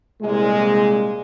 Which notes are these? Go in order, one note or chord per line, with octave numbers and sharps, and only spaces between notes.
C2 A#2 G#3